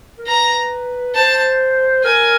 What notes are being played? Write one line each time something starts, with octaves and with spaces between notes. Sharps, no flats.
A#4
B4 A#5
C5 A5
A#4 G#5